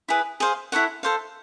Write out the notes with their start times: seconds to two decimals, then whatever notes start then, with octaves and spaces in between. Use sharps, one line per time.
0.08 E4 G#4 B4
0.40 G#4 C5 F5
0.72 E4 A4 C#5 F#5
1.03 A4 C5 F5